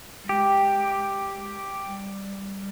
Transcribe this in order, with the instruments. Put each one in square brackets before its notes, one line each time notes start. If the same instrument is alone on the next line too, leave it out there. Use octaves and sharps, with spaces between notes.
[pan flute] G3
[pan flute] G#3 [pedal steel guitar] G4
[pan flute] G3